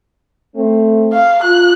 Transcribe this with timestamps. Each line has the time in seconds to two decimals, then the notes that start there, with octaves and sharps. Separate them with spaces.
0.55 A3 C4
1.13 F5
1.43 F4 F#6